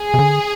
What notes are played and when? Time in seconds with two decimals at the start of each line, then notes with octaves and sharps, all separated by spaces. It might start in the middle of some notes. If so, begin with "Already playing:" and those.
Already playing: G#4
0.14 C3
0.19 D3